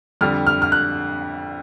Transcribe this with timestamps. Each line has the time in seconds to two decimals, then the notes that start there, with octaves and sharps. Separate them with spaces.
0.21 F2 D3 G3 F6
0.47 F6
0.62 F6
0.72 F#6